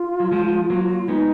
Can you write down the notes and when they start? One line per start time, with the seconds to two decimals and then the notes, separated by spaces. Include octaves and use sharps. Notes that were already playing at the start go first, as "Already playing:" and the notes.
Already playing: F4
0.20 F#3
0.31 F3 G#3
0.70 F#3 A#3
1.08 G#3 B3 D#4